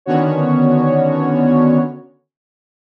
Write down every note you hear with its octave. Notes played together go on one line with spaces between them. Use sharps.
D3 D#3 B3 C#4 F#4 C#5